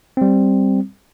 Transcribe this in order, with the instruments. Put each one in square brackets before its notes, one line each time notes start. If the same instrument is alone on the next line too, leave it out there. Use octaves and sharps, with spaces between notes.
[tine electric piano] G3 C4